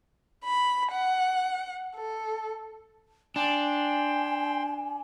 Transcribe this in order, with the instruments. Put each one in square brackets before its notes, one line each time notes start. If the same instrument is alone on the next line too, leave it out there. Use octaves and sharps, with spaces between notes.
[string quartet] B5
F#5
A4
[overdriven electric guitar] D4 [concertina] G5 C6 [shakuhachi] G#5